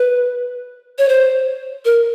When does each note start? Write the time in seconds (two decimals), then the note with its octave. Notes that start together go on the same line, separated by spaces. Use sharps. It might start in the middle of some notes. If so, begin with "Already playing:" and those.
Already playing: B4
0.99 C#5
1.09 C5
1.85 A#4